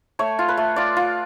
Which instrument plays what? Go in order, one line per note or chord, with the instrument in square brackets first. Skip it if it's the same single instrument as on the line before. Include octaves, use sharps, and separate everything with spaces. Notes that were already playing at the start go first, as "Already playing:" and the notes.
[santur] A3 C#5
F4
B4
A3
F4 D5
F4